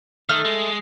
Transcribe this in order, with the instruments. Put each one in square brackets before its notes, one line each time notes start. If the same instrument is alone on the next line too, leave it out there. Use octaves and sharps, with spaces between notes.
[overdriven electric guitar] D#3 [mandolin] A3 F6
[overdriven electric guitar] G#3